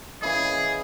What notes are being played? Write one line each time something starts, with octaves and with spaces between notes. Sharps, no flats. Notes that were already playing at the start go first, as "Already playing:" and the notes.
C#3 E3 G#4 D#5